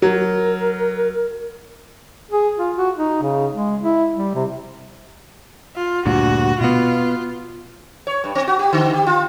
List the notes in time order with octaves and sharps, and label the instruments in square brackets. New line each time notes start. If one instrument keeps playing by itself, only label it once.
[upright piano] F#3 [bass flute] A#4
[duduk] G#4
F4
F#4
D#4
C#3
G#3
E4
G3
C3
[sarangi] F4
[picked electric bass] D2 G2 A#2 [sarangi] F#4
[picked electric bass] B2 B3 [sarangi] F4
[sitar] C#5
G2
C4
F#4
G4
D3
G4
F4